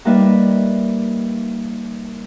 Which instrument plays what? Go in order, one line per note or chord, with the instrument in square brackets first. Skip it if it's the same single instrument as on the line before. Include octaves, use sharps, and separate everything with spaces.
[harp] G3 A#3 D#4 B4 D5 E5